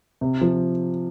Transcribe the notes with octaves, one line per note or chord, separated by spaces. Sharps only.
C3
F3